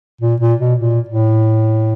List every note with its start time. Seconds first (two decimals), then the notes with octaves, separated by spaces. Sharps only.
0.21 A#2
0.41 A#2
0.60 B2
0.79 A#2
1.09 A2